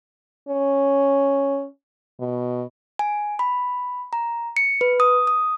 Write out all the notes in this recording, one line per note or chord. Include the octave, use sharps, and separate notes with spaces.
C#4
B2
G#5
B5
A#5
C#7
B4
D#6
D#6